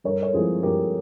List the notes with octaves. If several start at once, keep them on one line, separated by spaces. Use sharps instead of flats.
G2 A#4 C#5
C#5
F3 G#3 C4 E4 G#4 C5
G2 G4 A#4